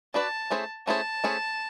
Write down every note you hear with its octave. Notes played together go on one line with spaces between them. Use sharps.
D4 F#4 B4 D5 A5
A3 C#4 E4 G#4 C5
A3 C#4 E4 G#4 C5 A5
A3 C#4 E4 G#4 C5